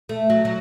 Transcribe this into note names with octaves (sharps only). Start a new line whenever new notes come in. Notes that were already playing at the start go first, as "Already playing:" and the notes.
A3
F#3
F#3